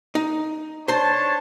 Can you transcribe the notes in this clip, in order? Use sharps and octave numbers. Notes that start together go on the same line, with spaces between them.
D#4
D4 C5 C#5 A5 C6